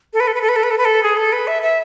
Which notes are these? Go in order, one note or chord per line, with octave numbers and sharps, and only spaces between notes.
A4
B4
A4
B4
A4
B4
A4
B4
A4
B4
A4
G#4
A4
B4
E5
E5